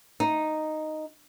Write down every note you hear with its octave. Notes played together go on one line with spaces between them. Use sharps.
D#4